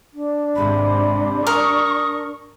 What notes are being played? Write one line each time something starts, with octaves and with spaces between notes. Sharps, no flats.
D4
G#1 G#2 C3 B5
A#4 C#6 D#6